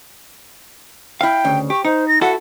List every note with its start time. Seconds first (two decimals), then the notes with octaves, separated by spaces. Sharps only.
1.21 E4 F5 G5
1.45 D2 C#3
1.70 G4 C#6
1.85 D#4 C5
2.08 A#6
2.21 E4 F#4 A4 F#5